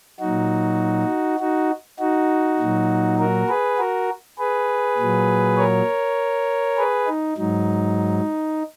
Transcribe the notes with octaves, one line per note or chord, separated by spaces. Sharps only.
F#3 D#4 F#4
A#2
D#4 F#4
D#4 F#4
A#2 F#3
F#4 A#4
G#4 B4
F#4 A#4
G#4 B4
A#2 F#3
A#4 C#5
G#4 B4
D#4
G#2 F#3 D#4